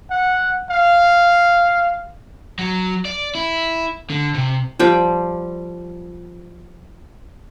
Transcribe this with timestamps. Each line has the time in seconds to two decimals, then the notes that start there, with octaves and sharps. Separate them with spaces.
0.10 F#5
0.70 F5
2.59 F#3
3.05 D5
3.35 E4
4.10 D3
4.35 C3
4.79 F3 G3 G5